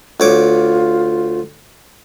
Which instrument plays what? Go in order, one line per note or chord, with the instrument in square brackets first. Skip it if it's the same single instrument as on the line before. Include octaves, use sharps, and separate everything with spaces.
[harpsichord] D2 C#5 D6 [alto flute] F4